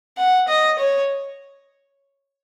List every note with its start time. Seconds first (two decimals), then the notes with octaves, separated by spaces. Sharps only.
0.18 F#5
0.48 D#5
0.79 C#5